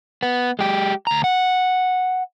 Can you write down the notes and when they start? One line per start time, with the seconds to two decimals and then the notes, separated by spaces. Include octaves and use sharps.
0.23 B3
0.59 G#3 G4
1.07 D2 A#5
1.24 F#5